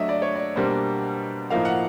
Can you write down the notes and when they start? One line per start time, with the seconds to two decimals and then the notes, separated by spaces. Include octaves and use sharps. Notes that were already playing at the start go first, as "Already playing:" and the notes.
Already playing: F#3 A3 D4 D#5 E5
0.09 D5
0.22 C#5
0.35 D5
0.56 B2 G3 A#3 D4 C5
1.50 A2 F3 A#3 D#4 F5
1.65 F#5